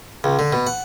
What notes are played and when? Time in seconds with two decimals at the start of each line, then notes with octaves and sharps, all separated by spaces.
0.24 C#2
0.39 D3
0.53 B2
0.67 F#5